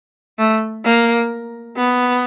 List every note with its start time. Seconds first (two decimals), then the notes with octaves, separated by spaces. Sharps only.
0.39 A3
0.85 A#3
1.77 B3